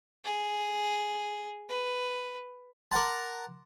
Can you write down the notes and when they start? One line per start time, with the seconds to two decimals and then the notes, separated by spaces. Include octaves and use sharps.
0.24 G#4
1.69 B4
2.92 A#4 F#5 A5 C6 D6